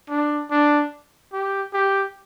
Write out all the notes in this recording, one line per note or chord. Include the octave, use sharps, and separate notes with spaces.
D4
D4
G4
G4